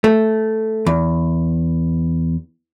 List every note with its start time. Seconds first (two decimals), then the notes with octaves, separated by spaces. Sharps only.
0.04 A3
0.86 E2